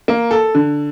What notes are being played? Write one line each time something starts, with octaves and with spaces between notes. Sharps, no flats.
A#3
A4
D3